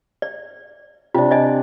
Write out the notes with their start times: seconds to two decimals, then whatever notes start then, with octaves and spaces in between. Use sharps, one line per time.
0.22 D5
1.14 C3 D4 F4
1.31 D5 D#5 G#5